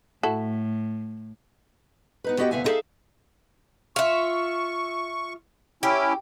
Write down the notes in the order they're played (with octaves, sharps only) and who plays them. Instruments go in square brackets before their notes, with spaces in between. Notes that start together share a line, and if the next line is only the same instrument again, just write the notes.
[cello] A2 [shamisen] E4 F#4 A4
[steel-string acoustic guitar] B3 D#4 B4
B3 F#4 G4 D#5 F#5 G5
D2 C3 B3 E5 F5 G#5
D#4 E4 G#4 A4 E5 F5
[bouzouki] F4 E5 [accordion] C#6
[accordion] C#4 E4 [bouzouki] G4